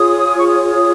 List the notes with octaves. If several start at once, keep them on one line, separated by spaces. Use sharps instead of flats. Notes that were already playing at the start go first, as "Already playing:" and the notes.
Already playing: F4 G#4 C#5 D#6
C#6
D#6